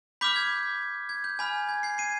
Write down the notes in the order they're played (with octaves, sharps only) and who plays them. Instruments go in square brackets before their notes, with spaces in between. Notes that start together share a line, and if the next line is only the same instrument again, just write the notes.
[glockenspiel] B5 D6 F6 G6 B6
G#6
G#6
G6
G#5 B5 F6
G#6
G#6 C7
C7 D#7